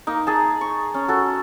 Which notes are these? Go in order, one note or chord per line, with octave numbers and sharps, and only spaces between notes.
A#3 D#4
G#4 A5
C#6
C#4
F#4 A4